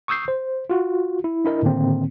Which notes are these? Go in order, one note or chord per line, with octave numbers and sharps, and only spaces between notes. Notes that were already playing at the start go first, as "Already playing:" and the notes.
C#6 D#6 E6 G6 C7
C5
F4 F#4
E4
D4 E4 A#4 D#5
A2 D3 D#3 A#3 C4